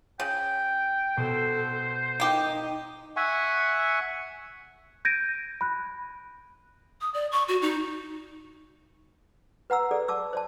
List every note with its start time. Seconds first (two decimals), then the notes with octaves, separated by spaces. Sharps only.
0.20 C#3 G5
1.17 B2 A4 C5
2.20 A#3 D#4 G4 D#5
3.16 E5 F#5 G#5 C#6
5.05 G6 G#6 A#6 D7 D#7
5.61 B5 F#6
7.01 D#6
7.14 D5
7.32 C#6
7.48 F#4
7.62 D#4
9.70 B4 F#5 A#5 E6
9.91 G#4 A4 D5
10.08 A5 D6 E6
10.33 C5 D5 A5